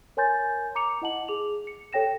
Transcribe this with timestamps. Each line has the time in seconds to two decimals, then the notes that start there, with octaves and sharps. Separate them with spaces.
0.17 A#4 C#5 G#5 C6 G6 A6
0.75 A#5 D6 C#7 F7
1.02 E4 D#5 F#5 A5 F#7
1.28 G#4 D6 F7
1.67 C#7
1.93 G4 A4 C#5 G5 A#6 E7